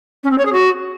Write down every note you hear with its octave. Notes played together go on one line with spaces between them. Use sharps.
C#4
C4
C#5
G#4
F#4